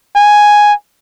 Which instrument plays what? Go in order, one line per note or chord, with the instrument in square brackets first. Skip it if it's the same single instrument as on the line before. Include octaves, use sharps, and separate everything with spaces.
[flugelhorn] G#5